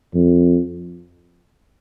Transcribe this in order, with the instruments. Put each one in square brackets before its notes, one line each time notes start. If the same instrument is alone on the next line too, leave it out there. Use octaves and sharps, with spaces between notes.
[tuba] F2